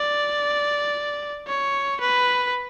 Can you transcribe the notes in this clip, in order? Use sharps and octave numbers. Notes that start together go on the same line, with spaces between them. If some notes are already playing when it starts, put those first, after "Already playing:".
Already playing: D5
C#5
B4